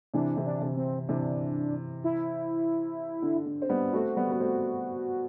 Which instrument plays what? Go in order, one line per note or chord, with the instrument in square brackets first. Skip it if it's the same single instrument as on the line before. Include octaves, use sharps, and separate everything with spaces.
[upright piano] C3 E3 [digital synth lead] D4
[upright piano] C3 E3
[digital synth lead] D4
[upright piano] C3
[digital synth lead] C4
[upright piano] C3 E3 [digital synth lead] D4
[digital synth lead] E4
[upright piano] D3
D3
C4
G3 B3
[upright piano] A3 C4 [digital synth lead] F#4
[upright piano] G3 B3
B3
A3 C4